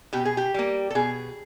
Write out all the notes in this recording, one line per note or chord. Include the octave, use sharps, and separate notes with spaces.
B2 G4
G#4
G4
G3 A#3
A4
B2 G#4